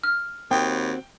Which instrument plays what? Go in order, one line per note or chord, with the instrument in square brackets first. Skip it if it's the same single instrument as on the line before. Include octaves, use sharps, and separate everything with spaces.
[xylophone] F6
[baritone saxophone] D#2 [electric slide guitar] C4 F#4 [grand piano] G5